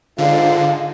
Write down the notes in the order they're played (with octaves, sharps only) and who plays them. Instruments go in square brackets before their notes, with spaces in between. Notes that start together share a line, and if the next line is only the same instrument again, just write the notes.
[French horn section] G#2 F4 [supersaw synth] D3 [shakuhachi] F5